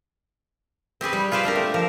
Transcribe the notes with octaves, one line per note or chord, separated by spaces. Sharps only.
C4 G4 G#4 B4
G3
F4 G#4 B4 C5 D5 F5
C4 D4 G4 A#4
A3
F3 A#4